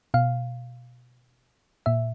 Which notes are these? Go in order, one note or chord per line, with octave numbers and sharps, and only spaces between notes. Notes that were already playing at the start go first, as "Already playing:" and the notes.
B2 F5
A#2 E5